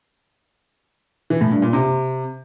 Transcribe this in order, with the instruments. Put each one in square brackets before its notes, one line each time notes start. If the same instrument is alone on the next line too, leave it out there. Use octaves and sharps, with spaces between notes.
[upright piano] E3
A2
G2
A#2
C3